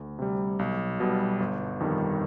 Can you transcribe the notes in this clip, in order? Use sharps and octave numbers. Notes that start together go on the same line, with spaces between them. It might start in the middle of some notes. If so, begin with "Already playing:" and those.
Already playing: D2
C3 G3
B1
B2 G3
G1
F2 D#3 G3